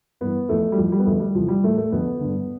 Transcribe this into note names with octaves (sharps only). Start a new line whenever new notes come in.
G2 E3 B3
F2 E3 A3
G3
F2 E3 F3
G3
B3
F2 D3 A3
G3
E2 C3 E3 F3
G3
A2 E3 A3
A3
F2 D3 B3
G2 D3